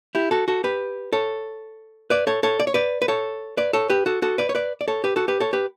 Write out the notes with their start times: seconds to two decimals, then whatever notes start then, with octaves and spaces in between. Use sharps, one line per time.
0.15 E4 G4
0.31 F#4 A4
0.48 F#4 A4
0.64 G4 B4
1.13 A4 C#5
2.10 B4 D5
2.27 A4 C#5
2.43 A4 C#5
2.60 D5
2.67 C#5
2.74 B4 D5
3.02 B4
3.08 A4 C#5
3.57 B4 D5
3.73 A4 C#5
3.90 G4 B4
4.06 F#4 A4
4.22 F#4 A4
4.38 B4 D5
4.49 C#5
4.55 B4 D5
4.81 D5
4.88 A4 C#5
5.04 G4 B4
5.16 F#4 A4
5.28 G4 B4
5.40 A4 C#5
5.53 G4 B4